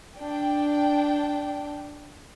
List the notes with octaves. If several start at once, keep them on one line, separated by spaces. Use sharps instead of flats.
D4 G5